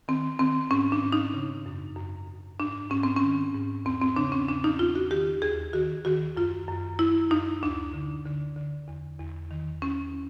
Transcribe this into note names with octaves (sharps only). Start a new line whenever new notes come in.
D#3 C4
D#3 C4
G#2 C#4
D4
G#2
D#4
C#3
F#2
F#2
F#2
G#2 D4
G#2 C#4
C4
C#4
D#3
G#2
E2 C4
C4
C#3 D4
C#4
E2 D4
D#4
E2 F4
F#4
D#3 G4
D#2 G#4
D#3 F#4
D#3 F#4
F#2 F4
F#2
F#2 E4
F#2 D#4
D2 D4
D3
D3
D3
E2
E2
D#3
E2 C#4